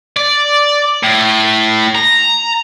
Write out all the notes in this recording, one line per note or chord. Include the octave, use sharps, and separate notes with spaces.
D5
A2
A#5